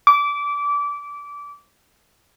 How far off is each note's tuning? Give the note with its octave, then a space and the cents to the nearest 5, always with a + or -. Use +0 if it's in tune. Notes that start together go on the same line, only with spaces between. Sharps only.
D6 -20